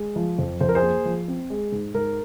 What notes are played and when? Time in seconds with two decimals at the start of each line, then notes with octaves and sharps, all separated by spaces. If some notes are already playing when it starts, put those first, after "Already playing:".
Already playing: G#3
0.16 F3
0.38 F2
0.60 F2 C5
0.69 A#4
0.75 G#4 C5
0.82 A#3
1.05 F3
1.28 C4
1.50 G#3
1.72 G#2
1.94 G#2 A#4